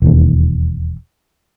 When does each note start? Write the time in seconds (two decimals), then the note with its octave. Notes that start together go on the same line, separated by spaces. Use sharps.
0.02 E1 D#2